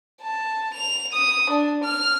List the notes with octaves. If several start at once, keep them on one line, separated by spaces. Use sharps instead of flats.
A5
F7
D#6
D4
F6